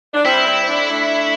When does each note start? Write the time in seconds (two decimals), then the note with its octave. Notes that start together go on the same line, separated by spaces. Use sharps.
0.14 D4
0.25 G3 C4 E4
0.46 G3 C4
0.63 C4
0.68 A3 D4
0.89 A3 D4